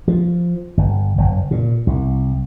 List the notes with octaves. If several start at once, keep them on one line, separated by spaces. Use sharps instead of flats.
F3
G1
F#1
A#2
C2